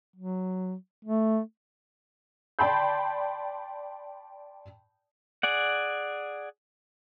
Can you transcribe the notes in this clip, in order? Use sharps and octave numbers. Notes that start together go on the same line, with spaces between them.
F#3
A3
D5 G5 A5 B5 C6 G6
G#4 D5 F#5